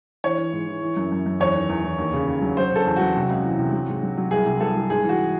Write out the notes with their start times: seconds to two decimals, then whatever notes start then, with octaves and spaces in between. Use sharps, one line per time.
0.24 E3 C#5
0.38 E3
0.52 G#2
0.67 E3
0.82 E3
0.97 F#2
1.12 F#2
1.26 F#2
1.40 E2 C#5
1.55 D#3
1.69 E2
1.84 E2
1.98 D#2
2.13 C#3
2.27 D#2
2.42 F#3
2.57 F#3 C5
2.71 C#3 A4
2.86 E2
2.96 F#3 F#4
3.16 C3
3.29 C#2
3.44 E3
3.59 C3
3.73 F#3
3.87 G#2
4.03 F#3
4.18 F#3
4.31 C2 G#4
4.46 C3
4.60 C2 A4
4.76 C2
4.90 G#2 G#4
5.04 E3 F#4